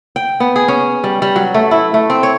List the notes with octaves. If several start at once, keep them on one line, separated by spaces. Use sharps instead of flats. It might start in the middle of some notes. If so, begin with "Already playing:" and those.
G5
B3
G#4
C#4
G3
G3
F#3
A3
E4
A3
C4
C#5